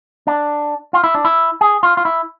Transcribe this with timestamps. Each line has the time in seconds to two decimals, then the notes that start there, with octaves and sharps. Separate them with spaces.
0.27 D4
0.93 F4
1.04 E4
1.15 D4
1.25 E4
1.61 G#4
1.83 F4
1.97 F4
2.05 E4